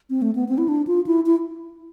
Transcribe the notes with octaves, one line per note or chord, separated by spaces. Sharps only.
C4
A3
B3
C4
E4
D4
F4
E4
E4